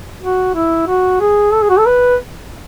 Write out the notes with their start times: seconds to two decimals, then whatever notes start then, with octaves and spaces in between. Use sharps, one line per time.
0.21 F#4
0.55 E4
0.87 F#4
1.20 G#4
1.53 A4
1.62 G#4
1.70 F#4
1.78 A4
1.86 B4